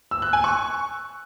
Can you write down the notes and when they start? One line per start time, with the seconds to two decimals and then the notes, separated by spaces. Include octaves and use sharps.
0.11 E6
0.22 F#6
0.33 G#5
0.44 C#6